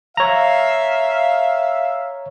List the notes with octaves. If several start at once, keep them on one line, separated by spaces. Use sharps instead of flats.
C#5 E5 F5 A#5